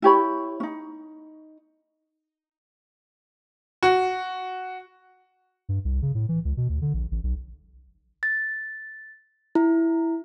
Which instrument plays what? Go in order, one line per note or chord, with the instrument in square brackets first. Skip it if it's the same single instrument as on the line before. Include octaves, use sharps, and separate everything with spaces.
[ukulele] E4 G4 C#5 B5
C#4 D#4
[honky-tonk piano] F#4
[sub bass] G2
C2
C#3
A2
E3
C#2
B2
D2
D3
A#1
A1
B1
[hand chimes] A6
E4